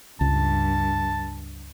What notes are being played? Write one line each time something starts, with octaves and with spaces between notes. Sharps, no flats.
C#2 G2 A5